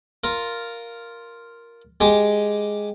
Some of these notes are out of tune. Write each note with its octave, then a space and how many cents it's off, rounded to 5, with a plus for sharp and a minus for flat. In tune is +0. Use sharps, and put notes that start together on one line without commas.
F4 +0 A#4 +0
G#3 +0 G4 +0 G#5 +0